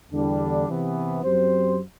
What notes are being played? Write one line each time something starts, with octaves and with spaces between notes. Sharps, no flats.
E2 D3 G3 D4
E2 C3 E3 B3
F#2 F#3 C4 G4 C5